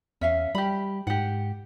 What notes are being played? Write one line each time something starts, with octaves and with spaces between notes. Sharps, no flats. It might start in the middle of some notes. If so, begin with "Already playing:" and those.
E2 C#4 E5 F5
G3 G4 B5
G#2 G4 F#5